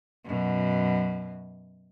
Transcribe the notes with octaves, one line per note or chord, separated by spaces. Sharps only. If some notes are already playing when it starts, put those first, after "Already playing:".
F#2 B2